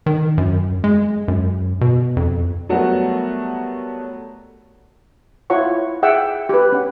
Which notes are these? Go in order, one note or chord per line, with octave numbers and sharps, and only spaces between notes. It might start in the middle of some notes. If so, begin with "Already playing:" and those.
D#3
F#2
G#3
F#2
B2
F2
F#3 G3 A3 B3 F#4 A#4
E4 F4 C#5 F#5 C#6
G#4 E5 F#5 G5 E6
G4 B4
C#4 F#5